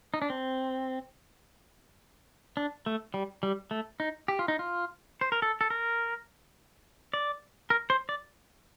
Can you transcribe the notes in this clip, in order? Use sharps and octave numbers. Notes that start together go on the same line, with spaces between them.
D#4
D4
C4
D4
A3
G3
G3
A3
D#4
G4
F4
D#4
F4
C5
A#4
A4
A4
A#4
D5
A#4
C5
D5